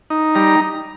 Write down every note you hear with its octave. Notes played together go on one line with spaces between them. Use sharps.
D#4
G3 A#5